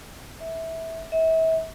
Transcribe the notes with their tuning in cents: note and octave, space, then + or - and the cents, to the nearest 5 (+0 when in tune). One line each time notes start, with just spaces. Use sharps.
E5 -15
E5 -35